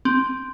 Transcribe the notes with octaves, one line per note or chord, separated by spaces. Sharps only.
C4